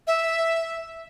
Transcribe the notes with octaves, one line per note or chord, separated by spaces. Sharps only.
E5